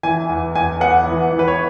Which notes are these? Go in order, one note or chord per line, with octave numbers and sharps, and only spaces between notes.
E3 G#5
E2
E2 G#5
B3 F#5
E3
E3
B4
C#5